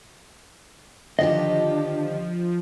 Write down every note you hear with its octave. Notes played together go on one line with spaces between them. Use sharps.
D3 D#3 F3 D4 G4 D#5